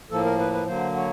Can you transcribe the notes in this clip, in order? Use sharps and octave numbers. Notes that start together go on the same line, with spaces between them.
A2 F3 A#3 A4
A#4
B4
B4
D3 F#3 A#3 C5
C#5